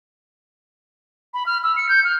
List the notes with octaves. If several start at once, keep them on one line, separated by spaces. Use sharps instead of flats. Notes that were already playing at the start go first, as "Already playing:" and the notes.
B5
F6
E6
C#7
G6
F6